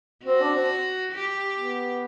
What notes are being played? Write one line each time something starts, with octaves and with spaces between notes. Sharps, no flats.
C4 F#4
D4
C4
G4
B3